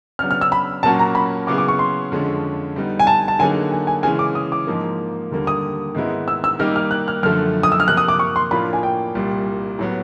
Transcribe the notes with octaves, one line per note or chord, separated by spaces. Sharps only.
C#3 F#3 B3 D4 F6
F6
E6
B5
A#2 F#3 A#3 C#4 F#4 A5
A#5
B5
C#3 F#3 B3 E4 G#4 D6
D6
C#6
C6
F2 D3 F3 G#3 C#4
D3 G3 B3 D#4
G#5
A5
A5
D3 F#3 A#3 D#4 G#4 G#5
G#5
G#5
C#3 E3 G#3 G#5
D6
D#6
D6
G#2 F3 A#3
D#2 D3 G3 A#3
D#6
G#2 D#3 G#3 B3 E4
E6
E6
D#3 G3 A#3 D#4 G4 F6
F6
F#6
F6
F#2 D3 F3 A3 F6
D#6
E6
F6
C3 F3 A#3 F#6
D#6
D6
C#6
C6
A2 F3 A#3 D4 F4 B5
G#5
G5
C2 A#2 G3
A2 F#3 B3